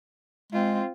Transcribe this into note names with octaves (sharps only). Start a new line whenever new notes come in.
G#3 C4 F4